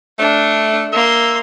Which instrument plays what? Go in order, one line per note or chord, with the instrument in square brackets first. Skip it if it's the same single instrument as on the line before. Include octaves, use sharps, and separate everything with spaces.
[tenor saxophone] A3 [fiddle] D4
[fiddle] A#3 C6 [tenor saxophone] E5